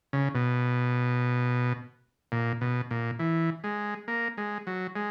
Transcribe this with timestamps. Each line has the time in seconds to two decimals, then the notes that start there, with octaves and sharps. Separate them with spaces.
0.13 C#3
0.35 B2
2.32 A#2
2.61 B2
2.91 A#2
3.19 E3
3.64 G#3
4.08 A#3
4.38 G#3
4.67 F#3
4.96 G#3